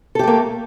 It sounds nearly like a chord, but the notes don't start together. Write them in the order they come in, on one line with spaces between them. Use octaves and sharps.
A4 G4 A3 A#3